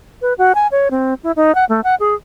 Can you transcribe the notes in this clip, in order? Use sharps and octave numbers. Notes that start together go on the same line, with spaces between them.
B4
F#4
G#5
C#5
C4
E4
D#4
F#5
A3
F#5
G#4